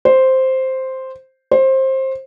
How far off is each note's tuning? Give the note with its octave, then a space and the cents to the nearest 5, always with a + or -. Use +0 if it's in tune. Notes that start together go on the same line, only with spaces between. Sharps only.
C5 +0
C5 +20